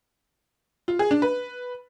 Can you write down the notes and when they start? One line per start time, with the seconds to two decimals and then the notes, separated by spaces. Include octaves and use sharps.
0.88 F4
0.99 G#4
1.11 D4
1.22 B4